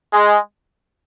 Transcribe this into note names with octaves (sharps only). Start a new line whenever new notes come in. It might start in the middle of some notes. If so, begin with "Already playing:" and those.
G#3